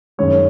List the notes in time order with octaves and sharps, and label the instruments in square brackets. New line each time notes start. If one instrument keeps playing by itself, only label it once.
[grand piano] F#2 D#3 G#3 C#5